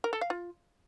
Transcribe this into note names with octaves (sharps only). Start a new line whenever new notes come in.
A#4
A4
F5
F4